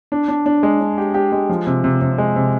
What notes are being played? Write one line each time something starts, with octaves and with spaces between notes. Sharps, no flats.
D4
D4
D4
G#3
D4
G4
G4
G#3
F3
C3
C3
C3
G#3
C3